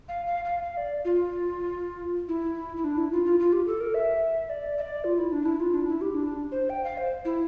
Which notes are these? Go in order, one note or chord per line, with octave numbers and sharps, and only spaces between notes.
F5
F5
F5
F5
D5
F4
E4
E4
D4
E4
F4
F4
F4
G4
A4
A#4
E5
D5
E5
D5
F4
E4
D4
E4
F4
D4
E4
G4
D4
C5
G5
F5
C5
E4